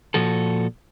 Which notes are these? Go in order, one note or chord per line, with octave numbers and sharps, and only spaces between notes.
A#2 F3 F#4 A4